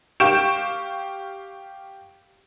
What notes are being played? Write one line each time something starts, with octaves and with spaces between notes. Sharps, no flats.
G4 F5 C#6 G6 D7 E7